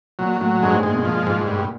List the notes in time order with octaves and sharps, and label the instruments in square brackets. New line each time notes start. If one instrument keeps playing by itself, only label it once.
[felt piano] A#2 [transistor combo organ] F#3
[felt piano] A2 [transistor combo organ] F#3
[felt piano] G2 [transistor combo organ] G#3
[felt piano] G#2
[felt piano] A#2 [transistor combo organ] G#3
[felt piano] B2
[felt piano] A#2 [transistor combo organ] F3
[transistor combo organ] G#2
G2